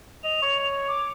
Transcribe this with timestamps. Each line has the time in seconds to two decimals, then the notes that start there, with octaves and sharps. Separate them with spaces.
0.24 D#5 F7
0.42 C#5
0.88 D6